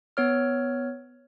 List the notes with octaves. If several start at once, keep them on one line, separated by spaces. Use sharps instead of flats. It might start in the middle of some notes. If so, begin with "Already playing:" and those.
B3 C#5 F6